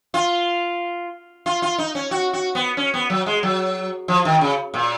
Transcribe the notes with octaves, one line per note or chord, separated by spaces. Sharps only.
F4
F4
F4
D#4
C#4
F#4
F#4
B3
C#4
B3
F#3
G#3
F#3
F3
D#3
C#3
A#2